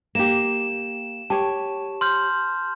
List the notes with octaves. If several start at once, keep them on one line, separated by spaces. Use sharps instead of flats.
A#3 G4 E7
G4 C#5 A5
C6 F6 G6